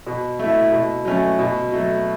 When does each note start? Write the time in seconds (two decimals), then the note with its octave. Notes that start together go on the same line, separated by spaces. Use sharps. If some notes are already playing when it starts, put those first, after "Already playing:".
0.07 B2
0.39 A3 E4
0.72 B2
1.05 F#3 A3 C#4
1.39 B2
1.72 F#3 A3